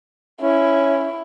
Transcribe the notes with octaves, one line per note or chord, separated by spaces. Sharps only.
C#4 E4